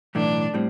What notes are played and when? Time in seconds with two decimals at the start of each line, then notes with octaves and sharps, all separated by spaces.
0.15 B1 A2 E3 A3 D4
0.54 A2 G3 C4